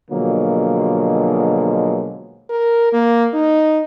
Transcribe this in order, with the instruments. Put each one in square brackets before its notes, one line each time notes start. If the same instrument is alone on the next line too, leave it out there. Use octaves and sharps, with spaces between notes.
[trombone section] B2 D3 F3 F#3 G#3 A#3
[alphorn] A#4
A#3
D#4